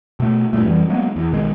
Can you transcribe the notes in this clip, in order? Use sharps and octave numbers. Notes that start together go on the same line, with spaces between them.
B2 A3
E1 G2 A#2 A3
F2 E3 G3
F#3 G#3 A#3 B3
E2
B1 D#3 G#3